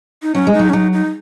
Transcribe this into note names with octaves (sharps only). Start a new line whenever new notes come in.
D#4
F#3 C#4
G#3
D#4
F#3
C#4
F#3 D#4
D#4